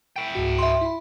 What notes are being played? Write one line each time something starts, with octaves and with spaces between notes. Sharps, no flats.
E4 G5
C#2 G#2 F#4
E5 C6
E4 B5